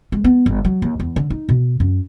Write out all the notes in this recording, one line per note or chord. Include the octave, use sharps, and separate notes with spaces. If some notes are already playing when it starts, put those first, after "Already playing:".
G#3
B3
G1
F#3
D#2
E2
D3
D#4
B2
F#2